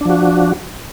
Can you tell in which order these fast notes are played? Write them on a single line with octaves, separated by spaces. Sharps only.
D4 F3 F#4